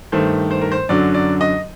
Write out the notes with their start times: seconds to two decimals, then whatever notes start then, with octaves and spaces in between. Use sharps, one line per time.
0.12 G2 D#3 A3 C5
0.51 C5
0.62 A#4
0.72 C5
0.89 F#2 D3 F#3 D5
1.15 D5
1.41 D#5